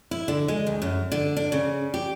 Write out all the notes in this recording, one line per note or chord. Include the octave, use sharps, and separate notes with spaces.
E4
D3
G#3
D2
F#2
D3
D4
C#3
G4